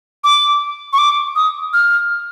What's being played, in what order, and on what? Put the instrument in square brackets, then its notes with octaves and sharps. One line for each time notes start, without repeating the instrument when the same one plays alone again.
[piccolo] D6
C#6
D6
D#6
F6